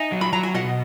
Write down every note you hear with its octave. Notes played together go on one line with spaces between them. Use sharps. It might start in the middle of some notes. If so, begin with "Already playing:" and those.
Already playing: D#4 E5 G#5
F#3
B5
F#3 A#5
G#5
B2 D#5 F#5